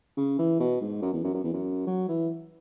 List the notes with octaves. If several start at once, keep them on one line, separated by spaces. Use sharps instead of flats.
C#3
E3
B2
G#2
F#2
E2
F#2
F#2
E2
F#2
F#3
E3